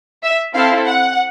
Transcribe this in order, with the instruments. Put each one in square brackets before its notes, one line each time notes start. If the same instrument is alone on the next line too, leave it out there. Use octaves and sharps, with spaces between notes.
[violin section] E5
C4 E4 A4 F5
F#5